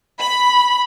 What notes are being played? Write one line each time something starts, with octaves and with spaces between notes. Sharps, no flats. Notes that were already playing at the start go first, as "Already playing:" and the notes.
B5